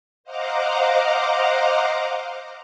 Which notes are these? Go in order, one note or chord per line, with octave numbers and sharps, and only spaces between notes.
C5 D#5 F5 F#5 A#5 D6